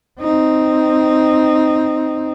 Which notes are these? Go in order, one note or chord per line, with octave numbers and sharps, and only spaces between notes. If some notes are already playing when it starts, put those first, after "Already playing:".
C4 D#4